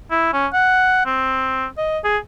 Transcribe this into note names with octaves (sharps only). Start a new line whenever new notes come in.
E4
C#4
F#5
C4
D#5
G#4